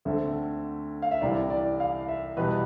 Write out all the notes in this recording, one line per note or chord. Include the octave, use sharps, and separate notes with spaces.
D2 D3 A3 C4 E5
F5
E5
C2 C3 E3 D5
D5
F5
E5
E2 B2 G3 B4